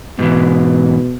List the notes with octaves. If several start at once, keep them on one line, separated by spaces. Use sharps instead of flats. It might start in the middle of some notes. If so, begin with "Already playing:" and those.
G#2 B2 E3